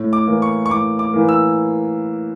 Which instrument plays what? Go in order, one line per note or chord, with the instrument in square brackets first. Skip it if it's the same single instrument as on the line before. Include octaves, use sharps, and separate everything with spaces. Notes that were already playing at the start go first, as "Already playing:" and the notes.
Already playing: [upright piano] A2
[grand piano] D6
[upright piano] E3 A#3
[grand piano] C#6
C#6
[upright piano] A2 [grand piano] D6
[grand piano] D6
[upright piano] E3 A#3
[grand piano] E6